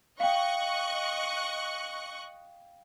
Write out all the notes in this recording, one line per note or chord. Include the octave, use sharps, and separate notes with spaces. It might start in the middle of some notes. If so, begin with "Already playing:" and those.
D#5 F5 G5 C#6 F#6